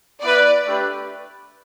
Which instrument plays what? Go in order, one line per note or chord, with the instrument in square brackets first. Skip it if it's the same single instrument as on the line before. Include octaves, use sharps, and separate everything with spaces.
[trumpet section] B3 E4 B4 [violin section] D5
[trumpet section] A3 D4 G4 B4